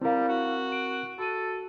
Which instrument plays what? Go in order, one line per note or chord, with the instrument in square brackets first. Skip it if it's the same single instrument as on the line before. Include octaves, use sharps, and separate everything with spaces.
[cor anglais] G3 [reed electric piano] C4 A#4 [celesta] E4 F5
[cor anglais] F#4
[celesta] D7
[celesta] F#4 D#7 [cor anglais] A4